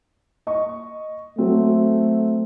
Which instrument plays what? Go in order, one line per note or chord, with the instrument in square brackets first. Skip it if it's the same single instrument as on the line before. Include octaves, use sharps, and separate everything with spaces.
[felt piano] D#5 C#6
[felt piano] F#3 C4 [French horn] A3